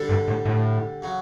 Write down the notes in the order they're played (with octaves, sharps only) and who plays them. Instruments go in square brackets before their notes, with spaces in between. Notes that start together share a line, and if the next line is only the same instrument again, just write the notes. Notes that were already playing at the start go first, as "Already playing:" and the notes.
Already playing: [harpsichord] D3 G3 D4 A4
[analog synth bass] G2
A2
A2
[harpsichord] C#3 F#3